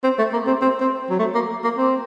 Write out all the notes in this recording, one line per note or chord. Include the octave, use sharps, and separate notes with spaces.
C4
A3
A#3
C4
C4
C4
F#3
A3
A#3
A#3
C4